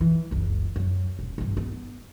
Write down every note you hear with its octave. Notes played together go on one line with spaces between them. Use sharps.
E3
F#1 C#2
F#2 F#3
D#1
G#1 G2
B3